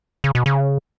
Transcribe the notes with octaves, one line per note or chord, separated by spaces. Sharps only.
C#3
B2
C#3